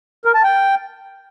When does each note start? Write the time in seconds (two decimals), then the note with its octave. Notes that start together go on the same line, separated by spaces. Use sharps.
0.25 A#4
0.34 A5
0.44 G5